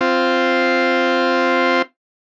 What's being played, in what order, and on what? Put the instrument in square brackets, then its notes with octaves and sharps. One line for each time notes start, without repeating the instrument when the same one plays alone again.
[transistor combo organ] C4 F4